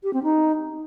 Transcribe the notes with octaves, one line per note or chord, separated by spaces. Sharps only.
G4
C4
D#4